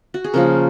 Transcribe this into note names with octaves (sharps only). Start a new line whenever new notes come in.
F#4
G#4
C#3 F3 A#3 A#4